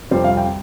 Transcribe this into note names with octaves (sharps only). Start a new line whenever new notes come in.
F2 C3 G3 C5
F5
G5